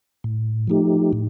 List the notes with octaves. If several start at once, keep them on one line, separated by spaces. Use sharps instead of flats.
A2
F3 A3 D#4 G4
A2